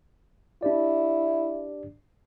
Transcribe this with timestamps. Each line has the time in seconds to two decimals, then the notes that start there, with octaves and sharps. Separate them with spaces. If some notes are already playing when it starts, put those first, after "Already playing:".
0.63 D4 E4 G4 D5